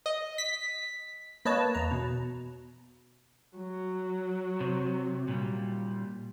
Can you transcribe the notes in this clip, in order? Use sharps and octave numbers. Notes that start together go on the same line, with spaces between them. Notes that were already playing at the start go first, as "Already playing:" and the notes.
D#5
B6
A#3 B4 C#5 D#5 A5
E2 A#5
B2
F#3
C3
A#2 G3